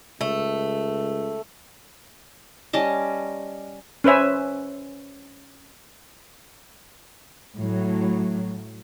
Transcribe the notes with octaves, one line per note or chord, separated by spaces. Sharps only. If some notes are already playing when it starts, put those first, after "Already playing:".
C#2 A3
G3 C#4 D#5 A5
C#4 B4 C5 E5 G#5
A2 F#3